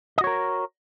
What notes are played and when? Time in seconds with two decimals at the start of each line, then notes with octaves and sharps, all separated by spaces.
0.18 D#5
0.21 F#4
0.24 C#5
0.27 A#4